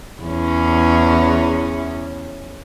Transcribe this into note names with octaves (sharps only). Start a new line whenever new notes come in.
E2 C#4